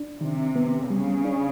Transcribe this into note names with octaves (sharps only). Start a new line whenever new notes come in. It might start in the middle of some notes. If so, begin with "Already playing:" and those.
Already playing: D4
C3 D#3
B3
C#3 G3
D4